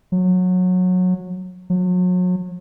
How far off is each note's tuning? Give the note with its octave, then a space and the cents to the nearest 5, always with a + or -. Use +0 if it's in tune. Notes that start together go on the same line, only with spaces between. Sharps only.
F#3 -20
F#3 -35